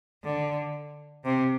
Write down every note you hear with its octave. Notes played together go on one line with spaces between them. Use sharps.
D3
C3